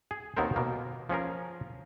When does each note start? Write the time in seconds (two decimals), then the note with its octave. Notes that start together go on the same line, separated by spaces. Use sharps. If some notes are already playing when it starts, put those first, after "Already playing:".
0.11 G#4
0.37 D#2 D#3 B3 C4 A#4 C5
0.56 B2 A#3
1.09 F3 C#4 G#4 A#4